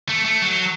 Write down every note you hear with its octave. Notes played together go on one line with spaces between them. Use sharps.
A3
A3
F#3